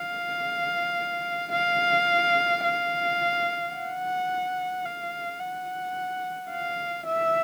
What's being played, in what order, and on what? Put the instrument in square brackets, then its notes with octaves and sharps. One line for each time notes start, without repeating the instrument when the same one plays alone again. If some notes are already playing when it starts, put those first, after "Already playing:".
Already playing: [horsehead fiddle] F5
F5
F5
F#5
F5
F#5
F5
E5